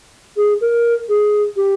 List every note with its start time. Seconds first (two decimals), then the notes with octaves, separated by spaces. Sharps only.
0.37 G#4
0.61 A#4
1.09 G#4
1.56 G4